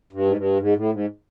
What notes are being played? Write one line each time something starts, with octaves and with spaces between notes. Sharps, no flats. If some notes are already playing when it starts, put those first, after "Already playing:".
G2
G#2
G2
G#2
A2
G#2